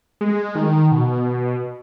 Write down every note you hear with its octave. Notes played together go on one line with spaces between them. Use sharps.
G#3
D#3
B2